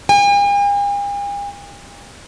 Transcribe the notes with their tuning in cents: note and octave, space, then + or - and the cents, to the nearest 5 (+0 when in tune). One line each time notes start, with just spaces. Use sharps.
G#5 -45